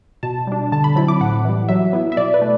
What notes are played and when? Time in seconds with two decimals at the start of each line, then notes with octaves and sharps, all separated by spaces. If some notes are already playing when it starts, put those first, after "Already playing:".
0.23 B2 A5
0.47 G3 D4
0.72 D3 A5
0.84 B5
0.96 F#3 C4 E4 B5
1.08 D6
1.21 A2 F#5
1.45 E3 G3
1.68 F#3 E5
1.93 B3 E4
2.12 E5
2.17 B2 D5
2.34 B4
2.41 A3